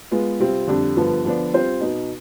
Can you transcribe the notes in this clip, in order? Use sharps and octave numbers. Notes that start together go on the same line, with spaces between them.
G#3 B3 F4
C3 G3 C4 F4
F2 D3 G3 D4
G2 D3 F3 B3 F4
D3 F3 B3 D4
G3 C4 F4 C5
B2 B3 D#4